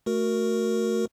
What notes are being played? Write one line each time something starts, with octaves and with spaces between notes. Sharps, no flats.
A3 F#4 A#4